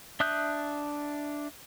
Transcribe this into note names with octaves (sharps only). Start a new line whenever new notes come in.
D4 E5 D#6 F#6 G6